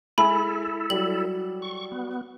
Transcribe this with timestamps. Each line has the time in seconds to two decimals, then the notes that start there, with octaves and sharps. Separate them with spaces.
0.18 G#3 E4 A4 E5 G#5 B5
0.90 F#3 G3 F#7
1.62 C#6
1.92 B3